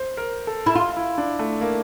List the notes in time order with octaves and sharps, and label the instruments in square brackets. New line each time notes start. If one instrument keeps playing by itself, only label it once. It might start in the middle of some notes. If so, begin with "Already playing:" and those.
Already playing: [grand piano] C5
A#4
A4
[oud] E4
F4
[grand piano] E4
D4
A3
A#3